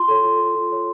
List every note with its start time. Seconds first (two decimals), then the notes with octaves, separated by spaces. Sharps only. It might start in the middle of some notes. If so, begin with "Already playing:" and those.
Already playing: F4 C6
0.08 A4 C#5
0.24 F4
0.40 A4 C#5
0.55 F4
0.70 A4 C#5